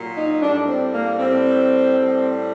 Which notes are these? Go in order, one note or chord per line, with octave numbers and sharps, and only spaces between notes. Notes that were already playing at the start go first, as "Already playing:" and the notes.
Already playing: A#2 F#3
D#4
A2 G3 D4
C4
A#3
A2 G3 C4
A2 G3